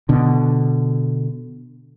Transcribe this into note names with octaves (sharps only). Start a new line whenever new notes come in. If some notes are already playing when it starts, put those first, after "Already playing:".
B2 D3